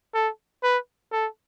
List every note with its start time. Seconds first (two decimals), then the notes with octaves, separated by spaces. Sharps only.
0.14 A4
0.63 B4
1.12 A4